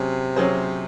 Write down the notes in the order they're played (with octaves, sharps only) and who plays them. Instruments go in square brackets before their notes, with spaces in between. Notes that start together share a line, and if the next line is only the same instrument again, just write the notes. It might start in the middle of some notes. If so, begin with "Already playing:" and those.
Already playing: [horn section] C3 [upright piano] F#3 C#4 G#4
[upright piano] F#3 C#4 G#4 C5